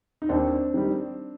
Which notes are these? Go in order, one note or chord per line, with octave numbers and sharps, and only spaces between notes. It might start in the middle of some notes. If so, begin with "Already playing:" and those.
D#4
D#2 C4 D4
D#3 G3